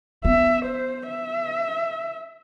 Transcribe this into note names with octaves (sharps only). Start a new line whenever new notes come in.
B3 E5
C5
E5